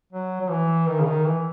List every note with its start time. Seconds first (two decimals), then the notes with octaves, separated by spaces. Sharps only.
0.13 F#3
0.41 F#3
0.50 E3
0.88 D#3
1.00 C#3
1.07 D#3
1.26 E3